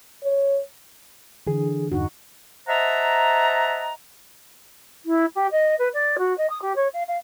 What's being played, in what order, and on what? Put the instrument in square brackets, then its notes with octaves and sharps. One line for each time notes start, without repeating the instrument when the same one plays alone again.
[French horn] C#5
[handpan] D3 [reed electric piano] E3 G#4
[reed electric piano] E2 G2 [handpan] D#4 F#4
[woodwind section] C5 D#5 E5 F#5 A5 A#5
[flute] E4
G4
D#5
B4
D5
F#4
D#5
D#6
G4
C#5
F5
F5